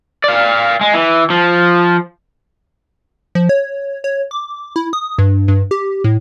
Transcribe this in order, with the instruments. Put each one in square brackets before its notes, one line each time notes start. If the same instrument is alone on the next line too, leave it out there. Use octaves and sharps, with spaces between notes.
[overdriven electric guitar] D5 F5
G#3
E3
F3
[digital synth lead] F3
C#5
C#5
D6
E4
D#6
G2
G2
G4
A2